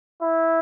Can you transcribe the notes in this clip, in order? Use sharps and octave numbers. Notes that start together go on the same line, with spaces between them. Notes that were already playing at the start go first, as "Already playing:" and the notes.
E4